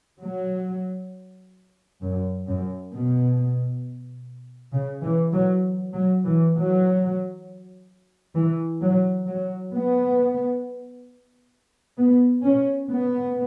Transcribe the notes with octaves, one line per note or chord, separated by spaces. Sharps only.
F#3
F#2
F#2
B2
C#3
E3
F#3
F#3
E3
F#3
E3
F#3
F#3
B3
B3
C#4
B3